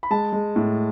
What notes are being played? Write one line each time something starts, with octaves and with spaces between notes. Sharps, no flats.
B5
G#3 A5
G#3
A2